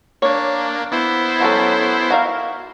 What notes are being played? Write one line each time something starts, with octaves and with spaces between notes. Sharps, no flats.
A#3 D4 C#5
B3 E4 C5
F#3 C#4 A4
F#4 A#4 F5